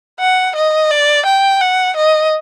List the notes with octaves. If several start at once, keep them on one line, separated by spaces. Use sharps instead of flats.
F#5
D#5
D5
G5
F#5
D#5